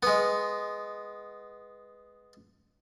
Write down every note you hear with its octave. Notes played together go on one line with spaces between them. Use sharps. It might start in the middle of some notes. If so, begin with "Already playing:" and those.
G#3 B3